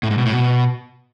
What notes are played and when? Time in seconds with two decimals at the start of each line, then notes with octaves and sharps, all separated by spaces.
0.03 A2
0.11 G#2
0.18 B2
0.25 A2
0.33 B2